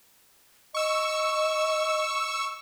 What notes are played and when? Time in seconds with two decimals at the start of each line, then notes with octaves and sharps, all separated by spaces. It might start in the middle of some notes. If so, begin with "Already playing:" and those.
0.74 D#5 C#6 E6